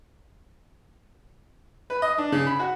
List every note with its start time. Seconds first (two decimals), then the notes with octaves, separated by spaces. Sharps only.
1.90 B4
2.02 D#5
2.18 D4
2.32 C#3
2.47 B5
2.59 F#4